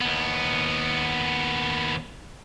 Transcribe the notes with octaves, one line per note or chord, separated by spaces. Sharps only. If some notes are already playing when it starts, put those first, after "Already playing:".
D#2 B3